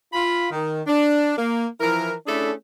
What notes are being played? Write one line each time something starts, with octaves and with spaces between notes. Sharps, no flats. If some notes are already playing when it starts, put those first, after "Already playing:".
F4 B5
D#3
D4
A#3
E3 F3 E4 A#4
A3 C#4 D4 E4 G#4 A4